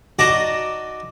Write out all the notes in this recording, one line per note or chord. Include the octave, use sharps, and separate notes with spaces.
D#4 F#4 D5 A5 A#5 D6